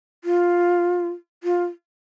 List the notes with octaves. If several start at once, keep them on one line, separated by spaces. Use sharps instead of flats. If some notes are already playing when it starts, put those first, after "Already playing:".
F4
F4